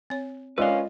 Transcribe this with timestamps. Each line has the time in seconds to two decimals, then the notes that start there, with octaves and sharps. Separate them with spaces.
0.10 C4 C#5
0.58 G#3 C#4 F4 A#4 B4 D5 D#5 F5